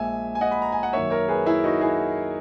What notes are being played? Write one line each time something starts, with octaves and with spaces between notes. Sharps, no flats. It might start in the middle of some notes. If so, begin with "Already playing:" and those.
Already playing: A#1 A#2 G#3 E5 G#5
G#5
D#5 F#5
B5
A#5
G#5
F#5
F#2 D#3 A#3 C#5 E5
A#4 C#5
G#4 B4
E4 G#4
D#4 F#4
E4 G#4